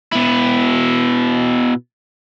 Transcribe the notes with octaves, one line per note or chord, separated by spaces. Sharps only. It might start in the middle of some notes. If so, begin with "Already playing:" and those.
B2 E4